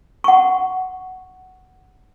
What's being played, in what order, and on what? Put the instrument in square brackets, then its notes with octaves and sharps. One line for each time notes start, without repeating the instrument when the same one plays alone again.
[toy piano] F#5 C#6